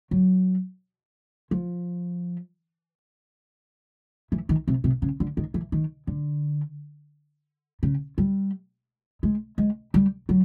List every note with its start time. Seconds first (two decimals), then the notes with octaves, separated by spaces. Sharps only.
0.11 F#3
1.51 F3
4.32 E3
4.49 D#3
4.68 C3
4.84 C3
5.02 C#3
5.20 D3
5.37 D#3
5.54 E3
5.72 D#3
6.07 D3
7.83 C#3
8.18 G3
9.23 G#3
9.58 G#3
9.94 G3
10.29 F#3